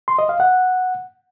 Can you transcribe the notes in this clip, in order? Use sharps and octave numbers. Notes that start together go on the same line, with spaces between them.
C6
D#5
F5
F#5